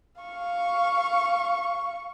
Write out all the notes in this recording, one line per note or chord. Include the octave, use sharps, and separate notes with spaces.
F5 C#6